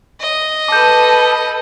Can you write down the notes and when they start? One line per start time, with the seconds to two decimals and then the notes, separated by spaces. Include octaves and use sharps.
0.20 D#5
0.68 A4 B4 D6 G6